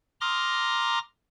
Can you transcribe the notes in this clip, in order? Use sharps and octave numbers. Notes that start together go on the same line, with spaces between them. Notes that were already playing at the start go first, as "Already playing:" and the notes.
A#5 C6 D6 D#6 F6 A#6